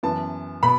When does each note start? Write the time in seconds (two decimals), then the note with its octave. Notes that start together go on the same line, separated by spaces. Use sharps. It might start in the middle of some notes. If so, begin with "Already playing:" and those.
0.03 F#2 E3 B3 A5
0.63 B2 B5